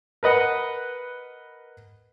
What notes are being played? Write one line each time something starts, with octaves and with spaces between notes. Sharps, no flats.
A#4 B4 D#5 F#5